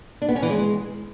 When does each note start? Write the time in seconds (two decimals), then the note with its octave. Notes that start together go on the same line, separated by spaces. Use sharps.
0.22 D4
0.29 B3
0.36 C#4
0.42 E3
0.49 G#3